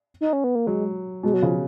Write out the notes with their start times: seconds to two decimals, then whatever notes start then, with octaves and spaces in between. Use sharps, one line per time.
0.21 D#4
0.33 C#4
0.44 B3
0.55 A#3
0.67 F#3 G#3
1.23 B2 G#3
1.34 F#3
1.42 C#3 F3